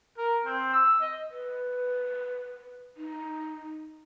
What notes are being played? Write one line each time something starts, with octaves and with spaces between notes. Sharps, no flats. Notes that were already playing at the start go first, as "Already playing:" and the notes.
A#4
C4
E6
D#5
B4
D#4